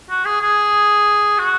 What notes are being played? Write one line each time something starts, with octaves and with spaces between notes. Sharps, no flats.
F#4
G#4
G#4
F#4